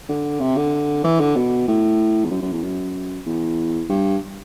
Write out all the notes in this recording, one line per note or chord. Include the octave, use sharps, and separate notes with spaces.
D3
C3
D3
E3
D3
B2
A2
E2
F#2
F#2
E2
F#2
E2
G2